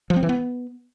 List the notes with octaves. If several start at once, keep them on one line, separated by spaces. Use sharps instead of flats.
F3
C4
E3
B3